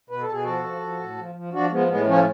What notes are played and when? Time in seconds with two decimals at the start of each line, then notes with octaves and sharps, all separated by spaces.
0.10 B2 B4
0.21 A4
0.29 B2 G#4
0.43 F3 F#4 A4
0.64 F3
0.81 F3
0.99 A2
1.18 F3
1.35 F3
1.53 F3 D4 F#4
1.71 F3 G#3 B3
1.89 A2 G#3 B3
2.06 F3 A3 C#4